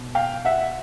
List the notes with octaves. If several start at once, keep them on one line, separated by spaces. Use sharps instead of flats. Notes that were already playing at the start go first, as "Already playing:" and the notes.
Already playing: B2
F5 G5
E5 F#5